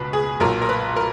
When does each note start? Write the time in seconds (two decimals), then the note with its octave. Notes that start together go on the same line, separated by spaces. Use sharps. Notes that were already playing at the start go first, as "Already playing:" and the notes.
Already playing: C#2 B2 B4
0.13 G#4
0.40 B1 A#2 F#3 A#4
0.62 A#4
0.69 B4
0.96 A#4